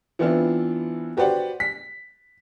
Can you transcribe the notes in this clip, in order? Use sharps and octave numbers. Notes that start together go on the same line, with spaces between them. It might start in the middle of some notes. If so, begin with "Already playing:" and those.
E3 B3 C4 D4 E4 F4
F#4 G4 B4 C5 D5 F#5
B6